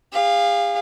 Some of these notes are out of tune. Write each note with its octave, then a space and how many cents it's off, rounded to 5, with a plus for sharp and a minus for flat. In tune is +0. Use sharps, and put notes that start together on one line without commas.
G#4 -40 F5 +0